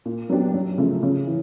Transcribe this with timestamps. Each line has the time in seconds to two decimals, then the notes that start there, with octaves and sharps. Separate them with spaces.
0.05 A#2
0.30 F#3 B3 D4 G4
0.54 F#2
0.78 C#3 F3 A3
1.03 C#3
1.27 E3